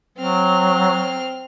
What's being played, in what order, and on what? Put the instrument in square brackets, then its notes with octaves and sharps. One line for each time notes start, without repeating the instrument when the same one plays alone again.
[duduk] F#3 [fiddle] C4 F6